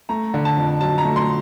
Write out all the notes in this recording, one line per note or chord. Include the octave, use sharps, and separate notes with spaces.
A3 A#5
D3
A5
F2
F#3 A5
A#5
A3
C6